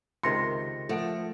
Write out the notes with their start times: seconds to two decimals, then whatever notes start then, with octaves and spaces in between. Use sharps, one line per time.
0.23 C#2 C3 D#3 A#4 C6 A#6 C#7
0.89 F3 A3 F#5 D7